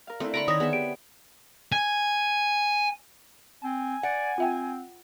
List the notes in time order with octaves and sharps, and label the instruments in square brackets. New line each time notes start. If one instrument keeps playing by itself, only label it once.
[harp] A#4 F5
[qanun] A3 [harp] C4 D4 E4
[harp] D3 [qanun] A#5 B5 C#6 [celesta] D7
[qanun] D#3 C#5 E5 [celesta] D#6 A#6
[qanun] B3 E5 [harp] G#4
[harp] G4 [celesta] D7
[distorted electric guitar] G#5
[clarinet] C4 [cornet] G#5
[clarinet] D5 [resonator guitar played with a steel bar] F#5
[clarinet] C4 [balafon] F4 E5 G5